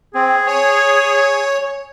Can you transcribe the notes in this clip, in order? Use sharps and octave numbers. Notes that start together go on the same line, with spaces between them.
C4 G#4
C#5 G#5